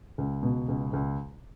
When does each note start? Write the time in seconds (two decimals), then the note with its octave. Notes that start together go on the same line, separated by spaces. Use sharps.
0.18 C#2
0.43 B2
0.68 C#2
0.93 C#2